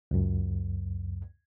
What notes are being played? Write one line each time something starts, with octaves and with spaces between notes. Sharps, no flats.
C#2 F#2